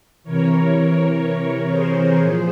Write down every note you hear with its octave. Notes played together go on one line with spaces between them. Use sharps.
C3 E3 A#4 C#5
G#4 C5
A#2 F3